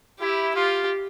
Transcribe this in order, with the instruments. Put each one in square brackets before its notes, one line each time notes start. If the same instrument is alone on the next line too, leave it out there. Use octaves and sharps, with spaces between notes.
[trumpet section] E4 [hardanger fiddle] G4
[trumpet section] F4 [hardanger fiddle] G4